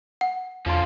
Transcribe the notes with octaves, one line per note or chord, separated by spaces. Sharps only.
F#5
E2 D3 F3 C#4 F4 A5 C6